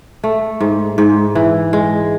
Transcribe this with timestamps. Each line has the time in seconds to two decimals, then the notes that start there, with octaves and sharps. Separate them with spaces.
0.24 A3
0.61 G#2
0.98 G#2
1.35 E3
1.73 G#3